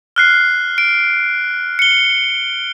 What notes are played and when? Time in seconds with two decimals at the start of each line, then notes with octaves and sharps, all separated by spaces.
0.16 F6 F#6 C7
0.78 D7
1.79 C#7 G7